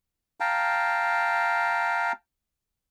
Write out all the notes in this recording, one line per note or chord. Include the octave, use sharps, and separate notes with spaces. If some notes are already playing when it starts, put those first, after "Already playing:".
F5 G5 A5 A#5